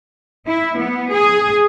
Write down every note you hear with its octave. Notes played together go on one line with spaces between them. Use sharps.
E4
B3
G#4